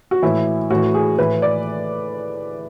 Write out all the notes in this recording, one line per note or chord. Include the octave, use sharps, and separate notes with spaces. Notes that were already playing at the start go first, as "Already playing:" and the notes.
F#4
A2 E3 E4
A2 E3 F#4
G#4
A2 E3 B4
D5